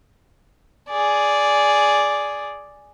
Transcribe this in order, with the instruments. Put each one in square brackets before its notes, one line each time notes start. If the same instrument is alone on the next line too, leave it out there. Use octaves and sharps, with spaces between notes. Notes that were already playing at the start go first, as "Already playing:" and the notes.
[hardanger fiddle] G#4 D5